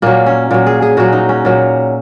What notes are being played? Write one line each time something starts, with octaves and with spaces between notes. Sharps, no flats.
A#2 F#3 A#3
C#4
A#2 F#3
G#4
G#4
A#2 F#3 F#4
D#4
C#4
A#2 F#3